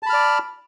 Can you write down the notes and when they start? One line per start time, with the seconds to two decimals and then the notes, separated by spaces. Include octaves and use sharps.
0.03 A5
0.06 B5
0.10 F6
0.13 D5